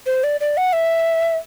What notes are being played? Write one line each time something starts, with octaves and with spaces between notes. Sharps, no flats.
C5
D5
D5
F#5
E5